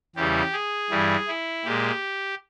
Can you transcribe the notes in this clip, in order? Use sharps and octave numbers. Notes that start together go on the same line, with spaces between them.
E2 C#3 E3 G3 G4
G#4
G2 E3 G3
E4
A#2 G#3 G4